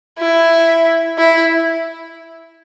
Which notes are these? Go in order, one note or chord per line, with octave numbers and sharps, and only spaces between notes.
E4
E4